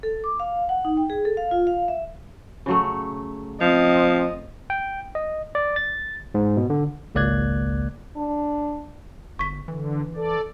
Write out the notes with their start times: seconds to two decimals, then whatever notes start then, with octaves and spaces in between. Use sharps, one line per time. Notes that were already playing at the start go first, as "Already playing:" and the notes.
0.03 A4
0.24 D6
0.40 F5
0.69 F#5
0.85 D#4
0.97 G5
1.10 G#4
1.25 A4
1.37 F5
1.51 F4
1.67 F5
1.88 E5
2.66 C#3 F#3 A3
3.61 F3 C4 D#5
4.70 G5
5.15 D#5
5.55 D5
5.76 A6
6.34 G#2
6.57 B2
6.70 D3
7.15 G#1 C#2 A#3 D5 F#6 G#6
8.17 D4
9.39 G1 C#6 B6
9.68 D3 E3
10.15 A4 D5